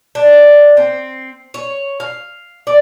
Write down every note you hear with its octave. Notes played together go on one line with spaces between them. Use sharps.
D4
C4
C#5
F5
D5